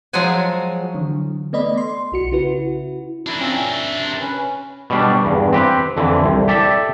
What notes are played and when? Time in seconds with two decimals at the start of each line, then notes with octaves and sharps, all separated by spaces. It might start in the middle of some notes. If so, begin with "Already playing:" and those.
0.13 F3 F#3 G#3 F#4 G#5
0.95 D3 E3 F#3
1.53 A3 B3 D5 D#5 B5
1.78 C6
2.12 B1 F#4 C#7
2.32 C#3 E4 F#4 B4
3.27 D4 E4 A#4
3.39 C4 C#4 F4
3.57 E5
3.98 C3
4.20 C#4 B4
4.90 B2 G3 D4
5.25 E2 G2
5.53 C4 G4 B4
5.96 F2 D3 E3
6.24 C2
6.48 G4 A4 D5 E5